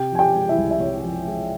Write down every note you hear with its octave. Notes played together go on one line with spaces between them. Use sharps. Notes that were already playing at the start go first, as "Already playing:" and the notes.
Already playing: C3 G4 G5
F3 G#5
G4 G5
G#3
E4 E5
C2
E5
C3 C#5
F3
G#3